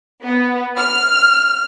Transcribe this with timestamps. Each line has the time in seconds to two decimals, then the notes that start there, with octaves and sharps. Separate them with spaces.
0.24 B3
0.78 F6